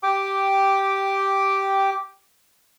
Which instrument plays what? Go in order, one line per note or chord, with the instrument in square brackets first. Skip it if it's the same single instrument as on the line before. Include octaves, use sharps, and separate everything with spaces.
[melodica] G4 G5 D6